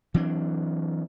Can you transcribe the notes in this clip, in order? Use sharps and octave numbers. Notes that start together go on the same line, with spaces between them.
E3 F#3 C4 D4